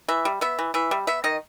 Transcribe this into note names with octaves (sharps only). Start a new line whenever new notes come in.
E3 E5
G3
B3 E5
E3
E3 E5
G3
B3 E5
D#3 D#5